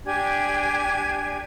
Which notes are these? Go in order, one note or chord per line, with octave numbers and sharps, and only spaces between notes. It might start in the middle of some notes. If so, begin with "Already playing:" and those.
D4 G4 G#5 G#6